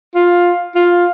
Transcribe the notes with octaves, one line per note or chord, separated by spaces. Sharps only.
F4
F4